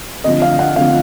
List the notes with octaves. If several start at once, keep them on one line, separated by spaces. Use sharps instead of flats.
D2 D3 F3 D#5
F5
F#5
D2 D3 F3 F5